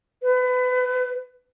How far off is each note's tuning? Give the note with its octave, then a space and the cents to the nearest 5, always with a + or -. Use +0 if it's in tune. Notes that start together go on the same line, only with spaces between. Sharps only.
B4 +30